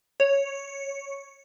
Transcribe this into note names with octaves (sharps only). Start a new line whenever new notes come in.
C#5